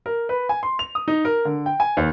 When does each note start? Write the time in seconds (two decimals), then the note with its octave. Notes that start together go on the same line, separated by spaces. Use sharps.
0.06 A#4
0.29 B4
0.49 G#5
0.63 C6
0.79 F7
0.95 D#6
1.08 D#4
1.25 A#4
1.45 D3
1.66 G5
1.80 G#5
1.97 D#2